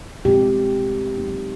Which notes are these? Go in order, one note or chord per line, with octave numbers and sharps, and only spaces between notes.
B2 G#3 C4 F4 G4
F#3 A#3 D#4